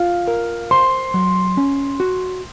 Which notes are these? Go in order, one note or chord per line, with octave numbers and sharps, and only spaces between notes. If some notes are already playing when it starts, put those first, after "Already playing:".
Already playing: F4 F5
A#4
C5 C6
F#3
C#4
F#4